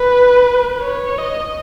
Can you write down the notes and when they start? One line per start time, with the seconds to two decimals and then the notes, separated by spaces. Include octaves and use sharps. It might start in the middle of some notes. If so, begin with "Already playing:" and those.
Already playing: B4
0.81 C#5
1.18 D#5